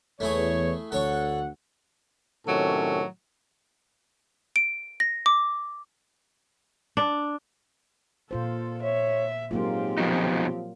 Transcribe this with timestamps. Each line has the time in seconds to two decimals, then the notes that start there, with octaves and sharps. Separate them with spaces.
0.20 E2 A3 E4 G#4 C#5
0.92 D2 A4 C#5 F#5 C#6
2.47 A2 C3 D#3 F#3 C#4 A4
4.56 D7
5.00 A#6
5.26 D6
6.97 D4
8.31 A#2 F4 A4 C5
8.83 C#5 E5
9.51 G#2 F#3 A#3 C4 F4 G4
9.98 F2 B2 F3 D#4